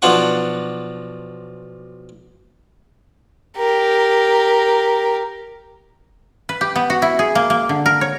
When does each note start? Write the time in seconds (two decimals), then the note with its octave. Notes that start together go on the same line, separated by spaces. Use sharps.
0.02 B1 F3 D4 C5 F#5 C#6
3.57 G4 A#4
6.49 B4
6.61 G4
6.76 B3
6.90 F#4
7.02 E4
7.19 G#4
7.35 A#3
7.50 A#3
7.69 D3
7.86 A#4
8.01 C#5